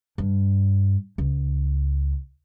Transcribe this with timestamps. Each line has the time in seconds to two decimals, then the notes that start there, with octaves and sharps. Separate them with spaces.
0.18 G2
1.18 C#2